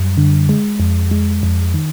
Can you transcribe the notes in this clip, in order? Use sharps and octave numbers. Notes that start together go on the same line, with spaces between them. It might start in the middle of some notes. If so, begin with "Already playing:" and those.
Already playing: F#2 G3
D3
G#3
F2
G#3
F2
D#3